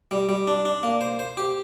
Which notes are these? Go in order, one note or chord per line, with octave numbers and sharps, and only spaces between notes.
G3
G3
D4
D4
A#3
C5
C5
G4